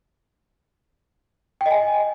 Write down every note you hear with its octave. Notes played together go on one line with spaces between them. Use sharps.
G5
D#5
G#5